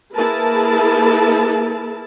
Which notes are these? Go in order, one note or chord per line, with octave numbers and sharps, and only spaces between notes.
A#3 E4 G#4 A#4 B4 A5